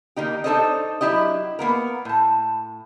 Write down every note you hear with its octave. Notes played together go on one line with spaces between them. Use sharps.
D#3 A#3 D#4 G4
D4 D#4 A4 C5 C#5 D#5
F#3 D4 E4 G4 D#5
A#3 B3 A#4
A2 A5